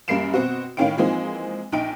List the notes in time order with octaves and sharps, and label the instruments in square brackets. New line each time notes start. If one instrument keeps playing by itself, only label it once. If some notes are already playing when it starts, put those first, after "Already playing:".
[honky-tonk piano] F#2 G3 A#3 C7 D7 E7
B2 C4 F#4
A2 D#3 C#4 F5 G5 D7
E3 F3 G#3 A#3 C4 D#4
A#1 D#4 G5 D7